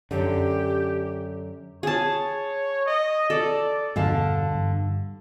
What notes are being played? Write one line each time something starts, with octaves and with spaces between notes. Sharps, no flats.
F#2 D3 G4
G#4 C#5 A5
D#5
A4 D5
E2 G2 B2 D3 F5 A5
G2